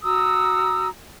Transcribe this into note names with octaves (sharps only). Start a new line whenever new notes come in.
F#4 A#5 D#6 E6